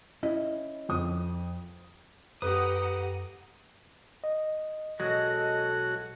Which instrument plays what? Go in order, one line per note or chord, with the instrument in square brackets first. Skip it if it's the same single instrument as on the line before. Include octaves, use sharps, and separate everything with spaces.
[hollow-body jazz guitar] C#4 E4 D#5
[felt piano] F2 D#6
[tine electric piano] F#2 [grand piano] A3 B4 [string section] G4 F#5 A#5 [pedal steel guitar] D#6
[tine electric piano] D#5
[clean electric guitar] B1 F#3 G#3 [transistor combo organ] F#4 [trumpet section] A4 [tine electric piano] D#5 A#6